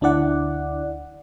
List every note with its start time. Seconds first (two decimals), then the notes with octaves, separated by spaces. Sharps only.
0.01 D2 D4 E4 D5 F#5